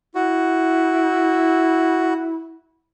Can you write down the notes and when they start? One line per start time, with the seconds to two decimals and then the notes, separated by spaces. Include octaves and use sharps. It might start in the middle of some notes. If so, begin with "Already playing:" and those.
0.15 E4 F#4